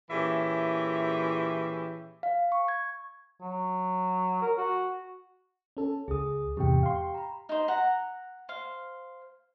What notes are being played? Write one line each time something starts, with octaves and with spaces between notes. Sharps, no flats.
A#2 E3 C#4 G4 G#4 E5
F5
C#6
G#6
F#3
A#4
F#4
C#4 A4
C#2 G#4 D#6
E2 G#2 C3 G4 G5
F5 C6
A#5 B5
D#4 C5
F#5 A#5
C5 F5